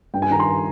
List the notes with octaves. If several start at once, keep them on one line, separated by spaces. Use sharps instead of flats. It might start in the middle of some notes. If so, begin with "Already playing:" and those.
G2 G5
G#5
D#3 A#5
C6